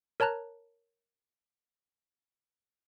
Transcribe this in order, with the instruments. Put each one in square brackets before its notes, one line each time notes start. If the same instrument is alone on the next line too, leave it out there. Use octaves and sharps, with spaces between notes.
[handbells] A#4 C#5 A5 A#5 F#6